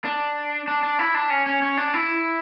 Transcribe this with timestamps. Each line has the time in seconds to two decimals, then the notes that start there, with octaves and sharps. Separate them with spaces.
0.05 D4
0.68 D4
0.83 D4
0.99 E4
1.14 D4
1.30 C#4
1.46 C#4
1.62 C#4
1.77 D4
1.94 E4